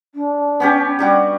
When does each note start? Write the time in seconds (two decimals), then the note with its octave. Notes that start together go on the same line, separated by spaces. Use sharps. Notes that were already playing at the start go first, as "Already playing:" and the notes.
0.15 D4
0.60 B3 C#4 G4
0.99 G3 D4 F#4